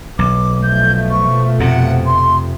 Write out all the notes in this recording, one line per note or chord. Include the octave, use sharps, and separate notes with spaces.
B1 D6
B2 F3 A3 G6
C#6
F2 C3 F#5
C6